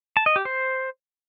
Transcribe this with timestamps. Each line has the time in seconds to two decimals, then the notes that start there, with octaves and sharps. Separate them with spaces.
0.17 A5
0.26 D#5
0.36 G4
0.45 C5